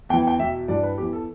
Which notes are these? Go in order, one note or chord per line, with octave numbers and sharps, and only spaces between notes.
E2 E3 G5
G5
E2 B2 E5
G2 E3 D5
B4
E2 E3 G4
A4